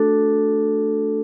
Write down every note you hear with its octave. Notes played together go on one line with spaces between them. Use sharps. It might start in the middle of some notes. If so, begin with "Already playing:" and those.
Already playing: A3 D4 F#4 A4